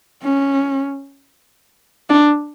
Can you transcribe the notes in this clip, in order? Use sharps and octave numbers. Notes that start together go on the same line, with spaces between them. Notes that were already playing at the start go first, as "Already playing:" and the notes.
C#4
D4